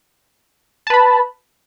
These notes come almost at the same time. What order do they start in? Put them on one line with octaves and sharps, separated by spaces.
A5 B4 B5